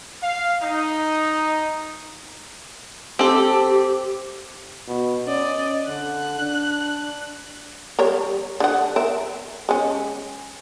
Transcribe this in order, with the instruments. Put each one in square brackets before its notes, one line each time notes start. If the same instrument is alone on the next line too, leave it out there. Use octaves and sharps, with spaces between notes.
[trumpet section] F5
D#4
[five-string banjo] C4 A4 [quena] G4
[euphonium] B2
[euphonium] C#4 [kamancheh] D5 D#5
[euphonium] D3 [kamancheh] F#6
[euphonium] D4
[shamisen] G3 A#4 C#5
D3 F#5
A#4 E5
G#3 C#4